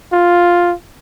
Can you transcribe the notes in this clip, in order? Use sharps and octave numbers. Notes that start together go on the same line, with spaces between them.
F4